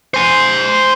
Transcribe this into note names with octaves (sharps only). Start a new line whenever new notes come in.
C5 G#5